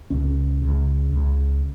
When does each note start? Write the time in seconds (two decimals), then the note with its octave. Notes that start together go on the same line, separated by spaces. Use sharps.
0.10 C#2 C#3 C#4
0.62 C#2 C#3
1.13 C#2 C#3